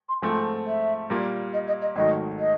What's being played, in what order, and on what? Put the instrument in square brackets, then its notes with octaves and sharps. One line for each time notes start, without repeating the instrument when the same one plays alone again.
[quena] C6
[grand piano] G#2 F3 A3 C4 [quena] G#5
[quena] E5
[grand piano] A#2 G3 A#3
[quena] D#5
D#5
D#5
[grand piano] G#1 G#2 D#3 F#3 A3 [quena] D#5
[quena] D#5